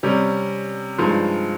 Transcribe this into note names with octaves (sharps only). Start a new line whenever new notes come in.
C3 G3 C#4
G2 F3 G#3 D#4